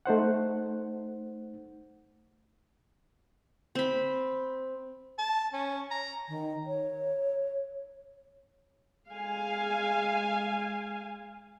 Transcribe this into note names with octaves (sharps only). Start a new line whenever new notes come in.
A3 D#4 C5 F#5
C4 B5
A5
C#4
A#5
D#3
C#5
G#3 F5 G#5